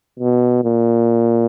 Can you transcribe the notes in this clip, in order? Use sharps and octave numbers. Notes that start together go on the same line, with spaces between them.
B2
A#2